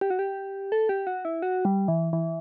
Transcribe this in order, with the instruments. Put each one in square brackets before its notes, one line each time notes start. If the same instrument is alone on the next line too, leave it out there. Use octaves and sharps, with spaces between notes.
[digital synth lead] G4
F#4
G4
A4
G4
F#4
E4
F#4
G3
E3
E3